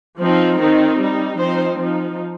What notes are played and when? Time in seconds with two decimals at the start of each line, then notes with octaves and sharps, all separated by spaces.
0.19 F3 C4 D#4
0.59 D#3 C4 D#4
0.99 G3 D#4
1.38 F3 C4 D#4 C5
1.78 F3 D#4